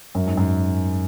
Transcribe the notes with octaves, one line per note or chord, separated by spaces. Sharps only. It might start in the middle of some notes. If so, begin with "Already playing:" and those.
F#2
G#2
F#2